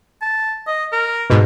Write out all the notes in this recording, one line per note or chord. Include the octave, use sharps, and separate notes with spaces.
A5
D#5
A#4
G#2 B2